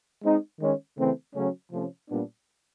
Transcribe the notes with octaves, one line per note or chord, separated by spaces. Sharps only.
G#3 C4 D#4
D#3 G#3 C#4
C#3 E3 A3 C4
C#3 F#3 A3 C#4
C3 F3 A3 C#4
A#2 G3 B3 D4